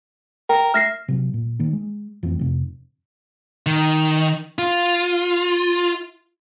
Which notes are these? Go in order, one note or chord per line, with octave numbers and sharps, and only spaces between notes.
A#4 G5
E5 F6 A#6 C7
C3 F#3
A#2
D#3 A#3
G#3
F2 E3 A3 C4
F2 C3
D#3
F4